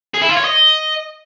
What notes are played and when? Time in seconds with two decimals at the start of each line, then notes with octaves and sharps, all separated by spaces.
0.14 G#4
0.22 E4
0.29 F4
0.37 C#5
0.44 D#5